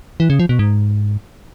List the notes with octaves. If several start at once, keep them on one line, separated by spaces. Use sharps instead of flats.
E3
C#3
F3
B2
G#2